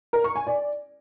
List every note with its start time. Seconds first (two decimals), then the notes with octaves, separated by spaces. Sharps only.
0.13 A#4
0.24 C#6
0.35 G#5
0.47 D5